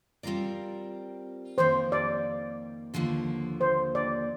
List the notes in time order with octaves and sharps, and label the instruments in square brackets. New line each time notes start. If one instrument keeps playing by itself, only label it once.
[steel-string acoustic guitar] G3 C4 F4 A#4 D5
[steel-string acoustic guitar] F2 D#3 A#3 [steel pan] C5
[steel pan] D5
[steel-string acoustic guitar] D#2 D3 F3 A#3
[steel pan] C5
D5